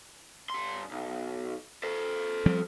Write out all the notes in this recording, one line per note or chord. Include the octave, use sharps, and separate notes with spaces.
G2 C6
B1
A4 C5
F3 G3 C4